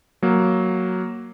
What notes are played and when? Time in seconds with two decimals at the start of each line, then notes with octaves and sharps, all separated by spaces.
0.22 F#3 A#3